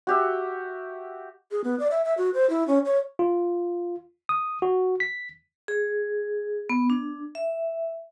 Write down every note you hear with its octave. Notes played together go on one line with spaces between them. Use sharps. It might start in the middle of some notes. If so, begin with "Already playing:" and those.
F#4 G4 E5
G#4
B3
D5
E5
E5
F#4
C5
E4
C#4
C#5
F4
D#6
F#4
B6
G#4
B3
D4
E5